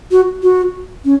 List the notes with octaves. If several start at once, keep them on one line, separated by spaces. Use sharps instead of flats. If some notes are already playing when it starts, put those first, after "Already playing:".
F#4
F#4
C#4